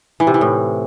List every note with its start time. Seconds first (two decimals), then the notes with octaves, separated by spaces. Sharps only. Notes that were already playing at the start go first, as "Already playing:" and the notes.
0.20 E3
0.27 C3
0.34 E3
0.41 A2